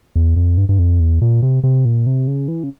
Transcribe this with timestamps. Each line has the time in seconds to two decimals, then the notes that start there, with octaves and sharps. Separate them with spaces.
0.16 E2
0.36 F2
0.57 G2
0.69 G2
0.79 F2
1.00 E2
1.22 A#2
1.43 C3
1.64 C3
1.85 A#2
2.07 C3
2.27 C#3
2.48 E3
2.64 C#3